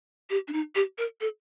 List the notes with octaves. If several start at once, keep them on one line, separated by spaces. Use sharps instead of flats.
G4
D4
D#4
G4
A#4
A4